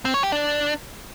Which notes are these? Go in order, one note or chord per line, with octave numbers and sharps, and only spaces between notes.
C4
C#5
G4
D4